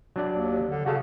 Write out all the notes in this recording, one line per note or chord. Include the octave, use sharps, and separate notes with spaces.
F#3 D4 D5
D#2
D3
C#3 F#4 A4 F5